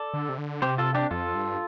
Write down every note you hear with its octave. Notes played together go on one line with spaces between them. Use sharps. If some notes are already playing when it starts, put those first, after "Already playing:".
Already playing: A4 D5
D3
C3
D3
C3 G4 C5
F4 A4
D4 G4
F2 F4 A4
G2